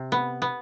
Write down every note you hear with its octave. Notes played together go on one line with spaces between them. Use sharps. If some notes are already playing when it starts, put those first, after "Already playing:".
Already playing: C3
B3
B3